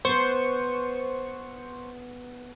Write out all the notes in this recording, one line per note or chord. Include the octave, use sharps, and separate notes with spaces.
B3 B4 C5 C#6